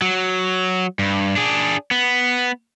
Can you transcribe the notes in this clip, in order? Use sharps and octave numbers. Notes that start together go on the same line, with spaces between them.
F#3
G2
D4 G#4
B3